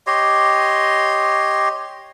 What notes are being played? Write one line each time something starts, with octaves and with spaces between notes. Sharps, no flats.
G4 C#5 D#5 C6